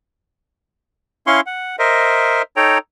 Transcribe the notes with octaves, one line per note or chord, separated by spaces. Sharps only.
C#4 E4 F5 C6 C#6
F#5
A#4 C5 D#5 E5
D#4 A4 C#5 G5 A#5